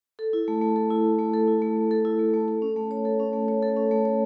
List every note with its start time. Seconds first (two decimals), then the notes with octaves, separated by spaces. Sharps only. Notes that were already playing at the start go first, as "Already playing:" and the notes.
0.19 A4
0.33 E4
0.48 A3
0.62 A3
0.76 A4
0.90 E4
1.04 A3
1.19 A3
1.34 A4
1.48 E4
1.62 A3
1.76 A3
1.91 A4
2.05 E4
2.19 A3
2.33 A3
2.48 A4
2.62 C#4
2.76 A3
2.91 C#5
3.05 A4
3.20 C#4
3.33 A3
3.48 C#5
3.62 A4
3.77 C#4
3.91 A3
4.05 C#5